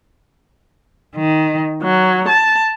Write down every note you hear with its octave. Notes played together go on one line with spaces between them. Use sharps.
D#3
F#3
A5